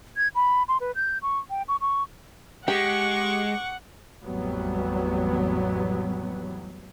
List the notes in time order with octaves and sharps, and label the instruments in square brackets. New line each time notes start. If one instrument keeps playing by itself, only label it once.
[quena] G#6
B5
C6
B4
G6
C#6
G5
C#6
C#6
[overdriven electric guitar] G#3 [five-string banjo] G4 [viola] F#5 [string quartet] C#6 D6
[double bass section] A1 F2 E3 F#3 G3 B3